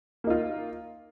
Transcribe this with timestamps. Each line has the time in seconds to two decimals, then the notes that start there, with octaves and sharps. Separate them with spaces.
0.24 A#3
0.27 D#4
0.30 F4